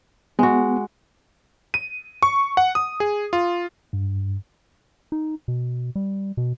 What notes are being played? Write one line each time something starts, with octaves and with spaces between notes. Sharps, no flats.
G#3 B3 F#4
D#7
C#6
F#5
D#6
G#4
F4
G2
D#4
B2
G3
B2